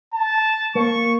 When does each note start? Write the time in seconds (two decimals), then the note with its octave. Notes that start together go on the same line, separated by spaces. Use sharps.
0.14 A5
0.75 A#3 C#6